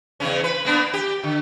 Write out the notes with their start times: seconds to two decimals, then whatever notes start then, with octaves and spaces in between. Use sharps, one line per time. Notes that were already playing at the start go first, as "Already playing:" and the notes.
0.20 E2 C#3 C#4
0.44 B4
0.65 A#3 B3 D4
0.93 G4
1.23 D3